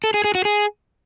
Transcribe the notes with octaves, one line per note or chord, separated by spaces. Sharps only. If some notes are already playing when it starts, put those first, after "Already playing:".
A4
G#4
G#4
F#4
G#4